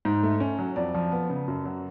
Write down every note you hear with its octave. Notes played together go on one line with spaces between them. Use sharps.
G#2
A3
C#4
F#3
F2 D5
F3
B3
C#3
F#2
F#3